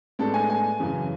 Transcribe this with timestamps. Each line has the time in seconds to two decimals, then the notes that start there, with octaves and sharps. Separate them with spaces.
0.19 A2 G#3 B3 D4 A4
0.34 G#5
0.50 G#5
0.80 F#2 C#3 E3